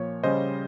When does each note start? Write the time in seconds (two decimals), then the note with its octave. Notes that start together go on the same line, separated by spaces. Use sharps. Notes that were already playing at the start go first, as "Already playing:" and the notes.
Already playing: A#2 F3 A#3 C#5
0.23 C#3 G3 C#4 C5 D#5